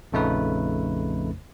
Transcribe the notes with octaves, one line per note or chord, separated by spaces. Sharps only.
A#1 F2 C#3 A3 D#4 B4